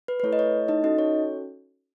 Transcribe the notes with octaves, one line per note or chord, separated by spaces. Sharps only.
B4
B4
A3 E4 A4 C#5
D#5
C#5
D#4 D#5
C#4 D#4 F#4 A4 D#5
C#5